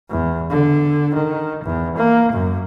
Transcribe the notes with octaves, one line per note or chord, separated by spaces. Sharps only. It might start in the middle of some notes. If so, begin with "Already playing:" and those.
E2
D3
D#3
E2
A#3
F#2